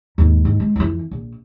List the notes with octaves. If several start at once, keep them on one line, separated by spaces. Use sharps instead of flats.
D#2 G#2
G#2
G#3
F2 E3
A#1